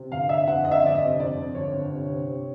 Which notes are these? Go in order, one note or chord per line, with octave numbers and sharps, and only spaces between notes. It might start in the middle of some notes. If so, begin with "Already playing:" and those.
Already playing: C3
G1 F5
G1 E5
F2 F#5
F2 D#5
E5
G1 D5
D#5
C3
F2 D5
F2
G1 C#5
G1
C3
C3
C3